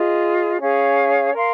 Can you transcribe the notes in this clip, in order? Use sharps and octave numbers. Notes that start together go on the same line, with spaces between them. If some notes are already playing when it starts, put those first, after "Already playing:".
Already playing: F4 G#4 D#5
C#4 G#4 C#5 F5
A#4 F5 C6